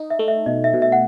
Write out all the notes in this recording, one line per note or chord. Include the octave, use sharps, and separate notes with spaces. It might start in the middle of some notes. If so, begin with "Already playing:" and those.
Already playing: D#4
E5
A3
E5
B2 D#5
E5
B2
E5
F#5